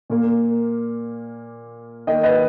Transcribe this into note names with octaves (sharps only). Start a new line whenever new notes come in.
A#2 A#3
D#3 A#3 D#5 G5
B4 D#5